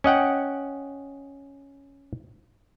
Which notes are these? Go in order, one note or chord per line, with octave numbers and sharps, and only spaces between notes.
C#4 D#5 F#5 G5